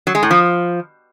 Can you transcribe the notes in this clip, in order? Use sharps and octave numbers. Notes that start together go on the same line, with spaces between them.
F#3
G#3
A2
F3